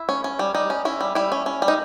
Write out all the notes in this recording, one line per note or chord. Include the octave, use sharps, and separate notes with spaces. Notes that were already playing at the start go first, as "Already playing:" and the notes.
Already playing: E4
C#4
C#4
G3
G3 D#4
C#4
C#4 E4
G3
G3 E4
C#4
C#4
G3
D#4